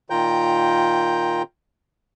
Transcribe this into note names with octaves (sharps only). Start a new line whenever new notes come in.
A#2 D#3 F4 G5 A#5 G6